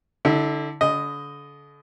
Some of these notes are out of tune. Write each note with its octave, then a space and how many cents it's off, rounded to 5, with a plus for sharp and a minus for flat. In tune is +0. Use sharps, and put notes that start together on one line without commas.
D3 +0 E4 -35
D3 -35 D#5 +0